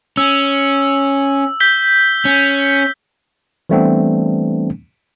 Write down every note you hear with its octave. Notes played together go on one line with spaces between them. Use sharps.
C#4 E6
G6 B6 G7
C#4
E3 G3 A3 B3 C4 D4